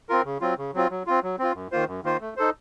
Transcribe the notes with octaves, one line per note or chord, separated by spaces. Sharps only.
C4 F4 A#4
C#3
F#3 C4 F4
C#3
F#3 C4 F4
F#3
C4 F4
F#3
C4 F4
F#2
D#3 A#3 F4 C5
F#2
D#3 A#3 F4 C5
A3
D#4 A4 C5